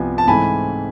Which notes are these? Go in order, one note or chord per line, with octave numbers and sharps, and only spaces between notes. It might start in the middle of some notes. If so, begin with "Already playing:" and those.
Already playing: C2 C3 F3 B3 G#5
A5
G#2 E3 A3 C4 G#5 B5